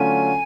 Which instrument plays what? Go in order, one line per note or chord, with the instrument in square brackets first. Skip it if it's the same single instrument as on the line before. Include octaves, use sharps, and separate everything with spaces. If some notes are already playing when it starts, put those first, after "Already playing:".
Already playing: [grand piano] D3 F#3 A3 C#4 F4 [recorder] G#5